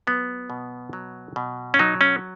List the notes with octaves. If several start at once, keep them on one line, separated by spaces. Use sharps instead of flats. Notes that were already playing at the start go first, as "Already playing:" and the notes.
F#3 B3
B2
F#3
B2
C#4
F#3 D#4
C#4